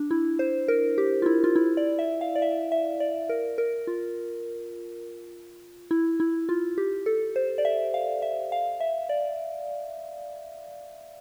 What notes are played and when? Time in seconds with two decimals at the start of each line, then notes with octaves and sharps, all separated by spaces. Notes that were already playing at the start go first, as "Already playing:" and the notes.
Already playing: D4
0.11 E4
0.39 C5
0.68 A#4
0.98 G4
1.22 F4
1.26 E4
1.44 F4
1.56 E4
1.77 D5
1.99 E5
2.21 F5
2.36 D5
2.42 E5
2.72 E5
3.00 D5
3.29 A#4
3.58 A#4
3.87 F4
5.91 E4
6.20 E4
6.49 F4
6.78 G4
7.06 A4
7.36 C5
7.58 D5
7.65 E5
7.94 F5
8.22 E5
8.52 F5
8.80 E5
9.09 D5